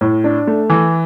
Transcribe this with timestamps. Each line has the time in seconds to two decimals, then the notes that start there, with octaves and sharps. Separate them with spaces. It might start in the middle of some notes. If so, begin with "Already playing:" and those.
0.01 A2
0.24 D4
0.47 A3
0.70 E3